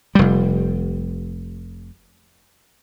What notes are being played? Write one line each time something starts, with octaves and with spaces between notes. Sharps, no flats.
F1 G3